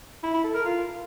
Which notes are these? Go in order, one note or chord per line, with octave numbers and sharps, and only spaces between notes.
E4
E4
A4
A#4
F4